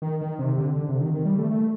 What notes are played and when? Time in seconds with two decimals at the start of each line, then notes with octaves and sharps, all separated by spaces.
0.02 D#3
0.21 D#3
0.39 C3
0.58 D3
0.76 D3
0.89 C3
1.01 D#3
1.14 D#3
1.25 G3
1.38 A3
1.51 A3